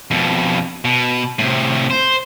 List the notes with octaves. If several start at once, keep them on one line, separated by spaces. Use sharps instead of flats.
F2 B2
B2
A2 C3
C5